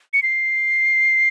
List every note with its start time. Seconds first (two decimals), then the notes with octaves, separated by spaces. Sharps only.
0.13 C#7
0.23 C7